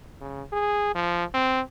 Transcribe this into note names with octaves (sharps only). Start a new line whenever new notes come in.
C#3
G#4
F3
C4